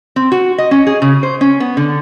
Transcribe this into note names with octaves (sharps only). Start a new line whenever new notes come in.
C4
F#4
D#5
C#4
G#4
C#3
C5
C#4
B3
D3